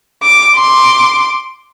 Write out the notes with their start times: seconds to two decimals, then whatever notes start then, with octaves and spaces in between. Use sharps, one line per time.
0.23 D6
0.55 C6 D6